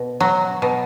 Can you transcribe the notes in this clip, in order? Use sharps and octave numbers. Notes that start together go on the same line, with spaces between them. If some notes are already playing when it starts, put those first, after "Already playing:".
Already playing: B2
F#3
B2